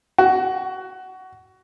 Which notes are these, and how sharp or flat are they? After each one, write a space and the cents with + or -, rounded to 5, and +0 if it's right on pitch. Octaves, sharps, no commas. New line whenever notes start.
F#4 +20